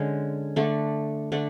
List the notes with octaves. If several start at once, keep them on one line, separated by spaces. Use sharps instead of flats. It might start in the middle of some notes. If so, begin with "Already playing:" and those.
Already playing: D3 G#3 C#4
D3 A3 D4
D3 A3 D4